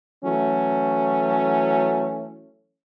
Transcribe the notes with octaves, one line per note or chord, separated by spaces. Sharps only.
E3 F#3 A3 C#4